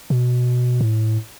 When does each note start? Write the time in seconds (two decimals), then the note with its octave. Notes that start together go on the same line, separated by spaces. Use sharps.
0.10 B2
0.81 A2